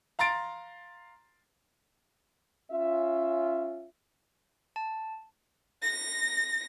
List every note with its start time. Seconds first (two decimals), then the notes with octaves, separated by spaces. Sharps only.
0.19 F5 A#5 C6 A6 D7
2.72 C#4 F4 E5
4.76 A5
5.82 A#6